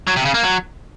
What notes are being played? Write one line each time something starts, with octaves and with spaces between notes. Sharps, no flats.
F#3
C3
C#3
A#3
F#3